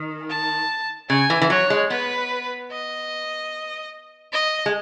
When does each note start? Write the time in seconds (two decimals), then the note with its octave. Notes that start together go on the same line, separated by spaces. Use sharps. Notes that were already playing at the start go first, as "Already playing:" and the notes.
Already playing: D#3
0.29 A5
1.09 C#3 G#5
1.30 E3
1.42 E3
1.50 F#3 C#5
1.70 G#3
1.90 B3 B4
2.71 D#5
4.32 D#5
4.66 G#3